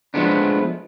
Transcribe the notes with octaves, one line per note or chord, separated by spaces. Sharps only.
F3 G#3 A3 B3 D4